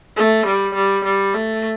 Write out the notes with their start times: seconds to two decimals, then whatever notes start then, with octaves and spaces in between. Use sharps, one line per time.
0.16 A3
0.46 G3
0.74 G3
1.04 G3
1.34 A3